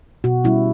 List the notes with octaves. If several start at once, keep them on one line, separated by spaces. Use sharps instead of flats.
B2 F#4
G3 C#4 E4